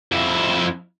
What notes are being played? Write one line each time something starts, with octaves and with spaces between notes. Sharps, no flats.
F2 E4